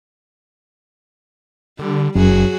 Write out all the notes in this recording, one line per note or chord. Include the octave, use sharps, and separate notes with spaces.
D3 G3
F#1 F#2 F#3 F#4 G#4